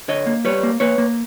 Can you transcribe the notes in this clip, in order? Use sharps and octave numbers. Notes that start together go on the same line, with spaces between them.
D3 C#5 D#5
A#3
G3 B4 C#5
A#3
A#3 B4 C#5
A#3